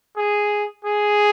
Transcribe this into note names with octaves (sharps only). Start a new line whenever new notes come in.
G#4
G#4